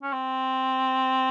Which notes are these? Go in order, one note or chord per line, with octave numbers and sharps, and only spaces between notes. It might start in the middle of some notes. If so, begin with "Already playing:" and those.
C#4
C4